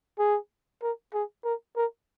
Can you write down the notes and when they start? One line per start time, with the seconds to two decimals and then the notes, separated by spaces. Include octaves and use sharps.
0.19 G#4
0.83 A#4
1.14 G#4
1.44 A#4
1.77 A#4